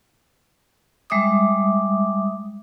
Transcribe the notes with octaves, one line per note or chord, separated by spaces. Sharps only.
G3 G#3 E5 D6 D#6